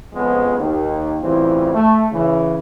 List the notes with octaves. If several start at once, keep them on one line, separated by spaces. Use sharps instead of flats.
F2 C#3 F3 G#3 B3
D#2
A2 C#3 E3 G3 C4 F4
A3
C#3 E3